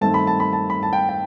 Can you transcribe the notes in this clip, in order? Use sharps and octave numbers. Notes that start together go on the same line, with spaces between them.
G2 D#3 A3 C4 A5
B5
A5
B5
A5
B5
A5
G5
G5